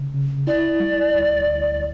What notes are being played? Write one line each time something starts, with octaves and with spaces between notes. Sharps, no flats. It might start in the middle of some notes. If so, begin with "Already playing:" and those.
Already playing: C#3
C#3
E4 D5
G3
D2
D2